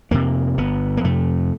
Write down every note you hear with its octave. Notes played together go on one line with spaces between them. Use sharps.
F2 C3 A#3
G1 B3
A#3
F2 C3 A3